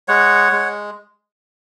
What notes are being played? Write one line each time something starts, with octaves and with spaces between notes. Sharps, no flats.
G#3 C#5 F#5
G#3